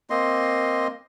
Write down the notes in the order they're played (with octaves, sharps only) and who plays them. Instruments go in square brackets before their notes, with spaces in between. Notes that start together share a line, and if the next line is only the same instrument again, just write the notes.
[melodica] A#3 C4 D#5 C6